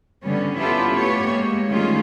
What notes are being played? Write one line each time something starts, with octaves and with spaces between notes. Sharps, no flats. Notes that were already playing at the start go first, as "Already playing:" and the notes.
D3 G3 B3 C#4
B3 C#4 E4 F4 G4 A4
A3 B3 G4 C#5
G#3 A#3
D#3 G3 A3 C#4 F4 G#4